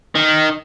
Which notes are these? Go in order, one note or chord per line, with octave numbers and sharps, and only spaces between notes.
D#3